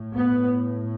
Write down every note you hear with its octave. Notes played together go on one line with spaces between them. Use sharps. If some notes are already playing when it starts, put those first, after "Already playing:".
Already playing: A2
B3